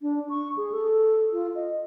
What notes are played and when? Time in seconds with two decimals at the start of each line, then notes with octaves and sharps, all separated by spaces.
0.02 D4
0.30 C#6
0.57 G#4
0.72 A4
1.32 F4
1.55 D#5